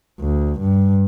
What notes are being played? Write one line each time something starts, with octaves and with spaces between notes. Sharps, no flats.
D2
G2